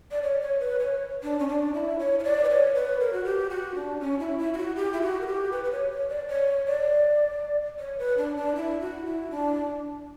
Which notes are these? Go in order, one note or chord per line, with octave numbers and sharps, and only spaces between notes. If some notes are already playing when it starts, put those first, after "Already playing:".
D5
C#5
C#5
B4
C#5
D4
C#4
D4
E4
C#5
C#5
D5
B4
C#5
B4
A#4
F#4
G4
F#4
D4
C#4
E4
E4
E4
F#4
G4
E4
F#4
A#4
G4
B4
B4
C#5
C#5
D5
C#5
D5
C#5
B4
D4
D4
E4
F#4
E4
D4